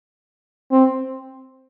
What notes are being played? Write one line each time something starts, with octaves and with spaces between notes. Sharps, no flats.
C4